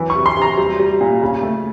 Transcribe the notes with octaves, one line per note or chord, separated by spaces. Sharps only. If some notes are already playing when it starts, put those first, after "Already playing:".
Already playing: E3 F#3
C#6
C3
C6
C3 A#5
G3
G3
A#2
C#3
A3